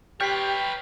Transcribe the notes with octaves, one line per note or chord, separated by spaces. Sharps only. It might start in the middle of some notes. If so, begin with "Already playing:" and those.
G4 B4 C#5 G5 F6 B6 C7